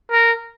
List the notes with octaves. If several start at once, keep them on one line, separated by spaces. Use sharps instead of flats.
A#4